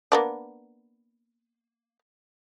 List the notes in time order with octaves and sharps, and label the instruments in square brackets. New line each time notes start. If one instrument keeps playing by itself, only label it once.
[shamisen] A#3 B3 D4